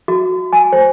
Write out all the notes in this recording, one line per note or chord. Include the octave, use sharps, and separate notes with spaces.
F#4
G#5
C5